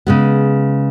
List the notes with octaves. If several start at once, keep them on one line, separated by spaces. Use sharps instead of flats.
C#3 G#3 B3